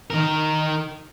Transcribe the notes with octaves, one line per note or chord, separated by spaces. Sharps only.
D#3 A#4